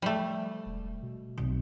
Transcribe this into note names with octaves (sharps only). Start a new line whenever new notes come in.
F3 G3 A3
E1
B2
B1 C3